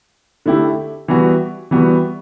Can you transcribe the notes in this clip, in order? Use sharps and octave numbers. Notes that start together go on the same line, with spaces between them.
D3 A3 E4 G4
E3 G3 B3 F#4
E3 G3 B3 F#4